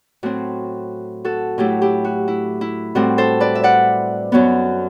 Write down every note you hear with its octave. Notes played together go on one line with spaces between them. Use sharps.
A2 F#3 C4 F#4
F#4 A4
A2 F#3 A3 E4 G4
E4 G4
F#4
E4
E4
A2 G3 C4 F#4
A4 C5
B4 D5
E5
D5 F#5
F#2 F#3 B3